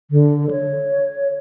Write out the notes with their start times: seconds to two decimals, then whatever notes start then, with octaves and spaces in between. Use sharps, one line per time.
0.11 D3
0.51 C#5